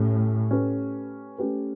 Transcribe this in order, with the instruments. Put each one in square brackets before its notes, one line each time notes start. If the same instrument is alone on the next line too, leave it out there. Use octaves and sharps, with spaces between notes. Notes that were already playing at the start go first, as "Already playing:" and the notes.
Already playing: [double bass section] A2 [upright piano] A3 C#4 G4
[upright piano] A3 C#4 G4 B4
A3 C#4 G4 B4